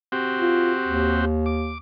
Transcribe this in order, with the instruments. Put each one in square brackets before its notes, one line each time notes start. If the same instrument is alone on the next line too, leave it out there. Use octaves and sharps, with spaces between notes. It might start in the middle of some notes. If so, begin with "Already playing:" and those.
[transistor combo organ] C4 F#4 G4
[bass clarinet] F4
D#2
[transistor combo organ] D6